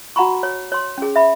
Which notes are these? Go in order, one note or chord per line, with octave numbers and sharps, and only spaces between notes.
F#4 F#5 A#5 B5 C#6
C#5
C#5 C6
C#4 G#4
E5 B5